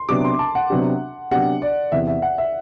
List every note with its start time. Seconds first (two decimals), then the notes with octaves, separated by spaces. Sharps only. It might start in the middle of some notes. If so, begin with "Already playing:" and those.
Already playing: C6
0.09 C3 F#3 B3 D4 G4 D6
0.25 C6
0.39 A5
0.55 F#5
0.70 C3 F#3 B3 D4 G4
1.31 C3 F#3 B3 D4 G4 F#5
1.62 D5
1.92 E2 C3 E3 B3 E5
2.07 E5
2.22 F#5
2.38 E5